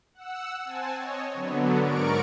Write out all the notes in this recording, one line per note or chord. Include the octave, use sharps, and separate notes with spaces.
F#5 E6
C4 G#5 A5
C#5 D#5
D3 F#3 B3
G#2 A#4 D5 C#6 D7